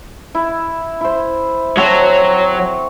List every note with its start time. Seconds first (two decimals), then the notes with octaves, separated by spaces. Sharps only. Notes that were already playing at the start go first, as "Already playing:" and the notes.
0.35 E4
1.01 E4 C5
1.77 F#3 C4 F#4 A4